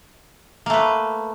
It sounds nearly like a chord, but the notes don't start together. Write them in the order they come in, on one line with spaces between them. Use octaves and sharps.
A#3 A3 B4